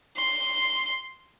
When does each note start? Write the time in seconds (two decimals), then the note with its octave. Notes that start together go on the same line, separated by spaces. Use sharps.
0.17 C6